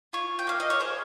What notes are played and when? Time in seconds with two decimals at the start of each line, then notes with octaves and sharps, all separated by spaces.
0.13 F4 C#5
0.39 G5
0.47 A#3 F5
0.60 D#5
0.70 C#5
0.80 G#4 C5